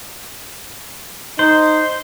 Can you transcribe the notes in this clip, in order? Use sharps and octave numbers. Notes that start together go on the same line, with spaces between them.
D#4 C5